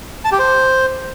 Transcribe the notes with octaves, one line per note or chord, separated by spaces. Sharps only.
A5
G4
C5